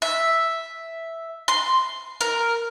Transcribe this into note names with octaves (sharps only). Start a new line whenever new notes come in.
E5
C6
A#4